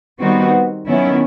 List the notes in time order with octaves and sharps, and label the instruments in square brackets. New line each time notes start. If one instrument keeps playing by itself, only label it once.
[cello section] D#3 G3 C4 D#4 F#4 [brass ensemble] B3
[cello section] D#3 F#3 B3 E4 [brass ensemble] C#4